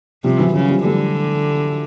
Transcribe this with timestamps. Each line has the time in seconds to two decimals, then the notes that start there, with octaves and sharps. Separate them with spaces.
0.24 C3 F3 G3
0.39 E3 F#3
0.54 C#3 E3 F#3
0.70 F3 G3
0.85 D3 G3 A3